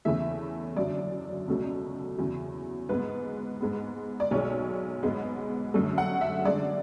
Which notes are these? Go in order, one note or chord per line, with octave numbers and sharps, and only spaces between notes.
E2 C#3 E3 A3 E5
F#2 D3 F#3 D5
C#2 B2 F#3 A3
E2 C#3 F#3
G#2 G#3 B3 B4
G#2 G#3 B3
D5
B1 B2 G#3 C#5
G#2 G#3 B3
F#2 D3 A3
F#5
E5
F#2 D3 G#3 D5